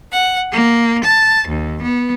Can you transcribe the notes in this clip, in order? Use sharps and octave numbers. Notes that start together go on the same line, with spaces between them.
F#5
A#3
A5
D#2
B3